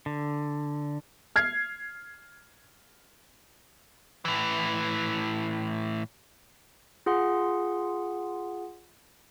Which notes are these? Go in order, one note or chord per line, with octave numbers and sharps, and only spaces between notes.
D3
F6 G#6 C7
A2 E3
F4 G#4 F#5 C6